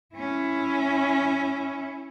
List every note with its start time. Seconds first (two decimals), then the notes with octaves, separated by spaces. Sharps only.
0.15 C#4 E4